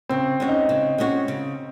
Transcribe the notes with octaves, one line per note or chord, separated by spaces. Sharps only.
C#3 C4
G#3 C#4 F#4
D#4
C#3
G#3 C#4 F#4
C#3